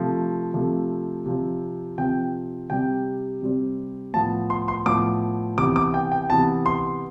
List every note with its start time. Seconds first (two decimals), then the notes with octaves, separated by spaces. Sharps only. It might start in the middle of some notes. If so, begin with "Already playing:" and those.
Already playing: C3 F3 A3
0.54 C3 F3 A3
1.26 C3 F3 C4
1.98 C3 F3 C4 G5
2.70 C3 G3 C4 G5
3.42 C3 G3 C4
4.14 A2 F3 B3 A5
4.50 C6
4.68 C6
4.86 A2 F3 B3 D6
5.57 C3 E3 B3 D6
5.76 D6
5.94 G5
6.12 G5
6.30 C3 E3 B3 A5
6.66 C6